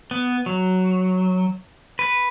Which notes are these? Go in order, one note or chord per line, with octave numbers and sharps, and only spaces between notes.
B3
F#3
B4